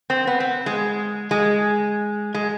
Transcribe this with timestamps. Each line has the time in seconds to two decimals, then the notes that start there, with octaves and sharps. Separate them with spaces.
0.10 C4
0.27 B3
0.40 C4
0.66 G#3
1.31 G#3
2.34 G#3